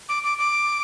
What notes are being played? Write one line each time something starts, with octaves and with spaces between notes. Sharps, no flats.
D6
D6
D6